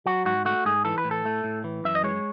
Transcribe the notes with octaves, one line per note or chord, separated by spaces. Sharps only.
F#3 F#4
G#2 F#4
A3 F#4
G#2 G#4
E3 A4
B4
A2
A4
A3
A2
E3
F#2 E5
D#5
G#3 C#5